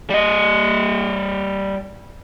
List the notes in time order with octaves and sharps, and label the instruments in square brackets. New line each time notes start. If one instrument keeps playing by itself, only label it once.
[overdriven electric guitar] G3 D#5